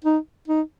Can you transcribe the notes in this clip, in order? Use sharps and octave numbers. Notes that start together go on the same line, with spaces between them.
D#4
D#4